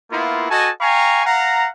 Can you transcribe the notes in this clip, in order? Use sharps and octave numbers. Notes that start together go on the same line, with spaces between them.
A#3 B3 E4 F4
F#4 A4 D#5 G#5 A5
F5 G5 G#5 A#5 C#6
F5 F#5 A#5